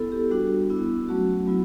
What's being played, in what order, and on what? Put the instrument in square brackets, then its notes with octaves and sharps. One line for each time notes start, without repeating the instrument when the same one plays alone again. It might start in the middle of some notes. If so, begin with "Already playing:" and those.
Already playing: [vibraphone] B3 E4 A4
G4
G3 D4 F#4
B3 E4
F#3 A3 C#4 F#4
F#3 B3 E4